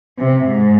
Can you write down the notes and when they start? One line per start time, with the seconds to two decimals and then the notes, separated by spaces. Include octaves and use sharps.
0.19 C3
0.47 G#2